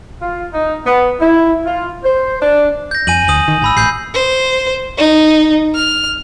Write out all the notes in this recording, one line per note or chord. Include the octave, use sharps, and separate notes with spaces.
F4
D#4
B3
E4
F4
C5
D4
G6 A#6
F2 G#5 D#7 F#7
D2 D#6 F#7
D#3
A1 G#5 B5 E6
A1 G6 C7
C5
D#4
F6